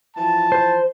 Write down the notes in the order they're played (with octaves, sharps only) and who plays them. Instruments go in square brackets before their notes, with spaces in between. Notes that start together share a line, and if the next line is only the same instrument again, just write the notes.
[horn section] E3 F3 A5
[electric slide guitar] C5